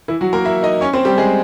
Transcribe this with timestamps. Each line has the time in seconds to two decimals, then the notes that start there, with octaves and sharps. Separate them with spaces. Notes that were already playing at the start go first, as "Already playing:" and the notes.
0.08 E3 E4
0.21 F#3 F#4
0.33 A#3 A#4
0.45 E4 E5
0.63 D#4 D#5
0.81 C#4 C#5
0.93 C4 C5
1.05 G3 G4
1.18 G#3 G#4